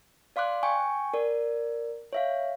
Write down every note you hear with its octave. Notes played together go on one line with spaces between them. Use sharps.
D5 F5 C6 D6 F#6
G5 G#5 C#6
A#4 D5
C#5 E5 F5